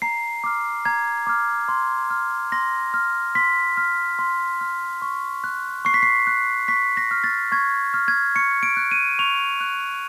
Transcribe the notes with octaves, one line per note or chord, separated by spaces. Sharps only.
A#5 C7
D6 F6
A#5 G#6
D6 F6
C6
F6
C6 A#6
F6
C6 B6
F6
C6
F6
C#6
F#6
C#6 C7
B6
C7
F#6
C#6 B6
A#6
F6
A6
C#6 G#6
F6
G#6
C#6 C#7
D7
F#6
D#7
C#6 F7
F#6